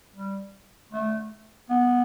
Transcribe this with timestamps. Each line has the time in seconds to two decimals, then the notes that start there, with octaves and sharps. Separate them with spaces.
0.14 G3
0.92 A3
1.69 B3